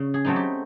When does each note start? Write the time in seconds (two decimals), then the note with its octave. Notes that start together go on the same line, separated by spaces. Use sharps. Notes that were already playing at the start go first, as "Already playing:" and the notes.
Already playing: C#3
0.14 G#4
0.25 F#3 A3 C4 D#4
0.36 G4